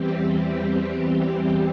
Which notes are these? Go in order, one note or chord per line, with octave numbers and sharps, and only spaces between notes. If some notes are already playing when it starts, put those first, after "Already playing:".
Already playing: E2 E3 G3 C4 G4